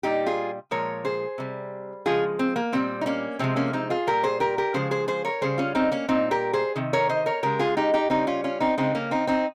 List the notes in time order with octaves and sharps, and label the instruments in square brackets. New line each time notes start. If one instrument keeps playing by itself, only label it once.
[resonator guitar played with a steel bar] A#2 G3 D#4 G4
F4 G#4
A#2 F3 G#3 A#4 C#5
G#4 C5
C3 G3
C#3 F3 G#3 F4 G#4
C4
A#3
A#2 G3 C4
D#4
A#3 C#4
C3 F3 G#3 C4
A#3 C#4
C4 D#4
F4 G#4
A#2 G3 G4 A#4
G#4 C5
G4 A#4
G4 A#4
C#3 F3 G#3 G#4 C5
G#4 C5
G#4 C5
A#4 C#5
C#3 G3 G#4 C5
C#4 F4
C4 D#4
A#3 C#4
A#2 G3 C4 D#4
G4 A#4
G#4 C5
C3 D#3
A#4 C#5
C5 D#5
A#4 C#5
C#3 G#3 G4 A#4
F4 G#4
D#4 G4
D#4 G4
C#3 G3 C4 D#4
C#4 F4
C#4 F4
C4 D#4
C#3 G#3 C4 D#4
A#3 C#4
C4 D#4
C4 D#4